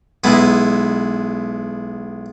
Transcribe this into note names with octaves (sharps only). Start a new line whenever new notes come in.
B1 G#3 B3 E4